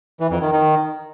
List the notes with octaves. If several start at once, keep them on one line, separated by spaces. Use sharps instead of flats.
E3
F2
D#3
D#3